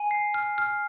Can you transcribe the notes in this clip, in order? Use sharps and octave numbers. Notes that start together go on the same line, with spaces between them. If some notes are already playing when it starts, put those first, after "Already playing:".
Already playing: G#5
C7
F6
F6